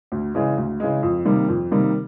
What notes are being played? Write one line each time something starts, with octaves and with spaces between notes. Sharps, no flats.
D2
C#3 E3 G#3
D2
C#3 E3 G#3
F2
C3 D#3 G3 A#3
F2
C3 D#3 G3 A#3